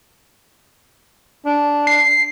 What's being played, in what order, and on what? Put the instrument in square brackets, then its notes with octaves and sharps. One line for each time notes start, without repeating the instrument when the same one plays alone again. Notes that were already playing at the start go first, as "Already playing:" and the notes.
[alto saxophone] D4
[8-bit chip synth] C7